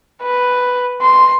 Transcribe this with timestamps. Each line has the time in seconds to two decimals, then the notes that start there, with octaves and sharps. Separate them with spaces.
0.22 B4
1.01 C6